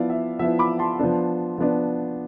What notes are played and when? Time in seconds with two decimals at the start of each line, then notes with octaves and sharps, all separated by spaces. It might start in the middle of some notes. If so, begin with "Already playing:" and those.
Already playing: F3 B3 E4 D5 F5
0.10 E5
0.39 F3 B3 E4 E5
0.59 B5 D6
0.79 A5 C6
0.99 F3 B3 D4
1.58 F3 B3 D4